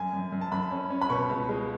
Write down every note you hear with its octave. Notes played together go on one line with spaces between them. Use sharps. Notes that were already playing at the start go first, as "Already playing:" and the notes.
Already playing: F#2 G#5
F#2
F#2
A5
F#2 B5
C#4
C#4
B5
B2 C#6
C#2
G#3